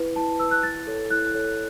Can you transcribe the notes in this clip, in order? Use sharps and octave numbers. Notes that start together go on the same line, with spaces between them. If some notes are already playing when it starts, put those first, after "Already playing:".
Already playing: E4 B4
E4 A5
B4 E6
F#6
E4 A6
A4 C#5
E4 F#6
A4 C#5